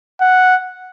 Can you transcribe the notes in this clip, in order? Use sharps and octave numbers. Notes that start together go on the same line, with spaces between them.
F#5